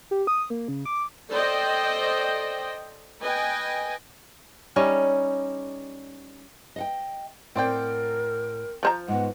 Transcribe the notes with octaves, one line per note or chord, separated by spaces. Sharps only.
G4
D#6
A#3
C#3
D6
A4 C5 D5 D#5 G5
B4 D#5 G5 G#5
G3 C#4 D#4
D#5 F#5 G5
A2 C4 A#4 D5 F#5 G5
F3 C5 A#5
G#2 B3 F#5